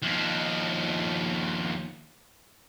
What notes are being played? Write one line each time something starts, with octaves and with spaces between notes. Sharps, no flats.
D#2 F3